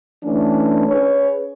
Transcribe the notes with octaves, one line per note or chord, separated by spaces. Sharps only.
E3 A3 C#4 D4
C#4 G#4 B4 C#5